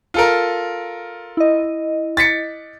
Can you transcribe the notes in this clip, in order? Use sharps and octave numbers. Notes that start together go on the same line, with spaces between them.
F4 A4 A#4
E4 D#5
A6 B6 C#7